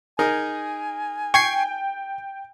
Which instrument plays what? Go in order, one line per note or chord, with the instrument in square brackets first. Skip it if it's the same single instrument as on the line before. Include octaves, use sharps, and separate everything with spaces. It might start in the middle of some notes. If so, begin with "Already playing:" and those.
[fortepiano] D#4 G#4 A#4 [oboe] G#5
[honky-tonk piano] G5 [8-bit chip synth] C#6 G#6 C7